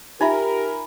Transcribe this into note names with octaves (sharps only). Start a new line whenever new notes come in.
D#4 F4 G4 A#4 E5 G#5 A#5 B5